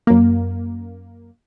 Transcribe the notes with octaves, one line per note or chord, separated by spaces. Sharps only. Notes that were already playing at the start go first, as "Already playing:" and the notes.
F#2 A#3